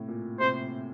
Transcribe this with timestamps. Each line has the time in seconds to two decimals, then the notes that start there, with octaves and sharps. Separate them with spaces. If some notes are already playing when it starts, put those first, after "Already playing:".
Already playing: A2 C3
0.08 A#2
0.40 C3 C5